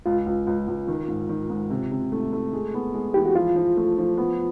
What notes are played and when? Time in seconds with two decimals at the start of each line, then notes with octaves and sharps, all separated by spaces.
0.06 C#2 F4
0.26 C#2
0.47 C#2
0.68 C#2
0.88 D#3
1.08 G#2
1.29 D#3
1.50 G#2
1.70 C3
1.91 C3
2.12 A3
2.33 A3
2.53 G#3
2.74 B3
2.94 G#3
3.14 E3 G4
3.25 F#4
3.35 F3 F4
3.56 F3
3.77 A3
3.98 F3
4.17 B3